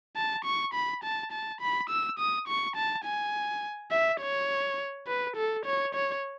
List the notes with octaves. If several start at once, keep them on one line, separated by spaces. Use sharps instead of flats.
A5
C#6
B5
A5
A5
B5
E6
D#6
C#6
A5
G#5
E5
C#5
B4
A4
C#5
C#5